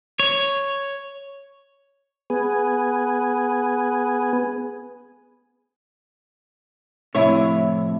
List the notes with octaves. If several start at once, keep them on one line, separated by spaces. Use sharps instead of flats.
C#5
B3 G#4
F2 A2 C3 E4 C#5